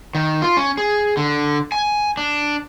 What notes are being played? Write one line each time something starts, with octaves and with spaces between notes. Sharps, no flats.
D#3
F4
C#4
G#4
D3
G#5
D4